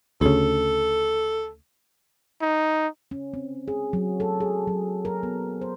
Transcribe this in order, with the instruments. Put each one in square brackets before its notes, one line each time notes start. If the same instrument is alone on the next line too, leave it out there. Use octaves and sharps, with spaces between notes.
[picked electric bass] D2 C#3 [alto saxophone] A4
[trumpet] D#4
[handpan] C#4
C4
G#4
F#3
A4
G#4
F#3
A#4
B3
C5